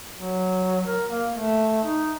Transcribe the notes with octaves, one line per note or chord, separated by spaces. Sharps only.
F#3
A#4
A#3
A3
D#4